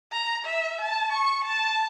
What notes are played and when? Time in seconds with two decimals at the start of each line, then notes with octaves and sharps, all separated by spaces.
0.12 A#5
0.45 E5
0.82 A5
1.12 C#6
1.45 A5